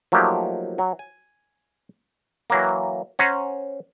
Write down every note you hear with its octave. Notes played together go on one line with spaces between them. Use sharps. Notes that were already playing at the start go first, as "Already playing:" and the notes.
F3 F#3 A3 A#3 D#4 G4
F#3
G#5
E3 F#3 A#3
C#4 C5 F#5 G#5 A#5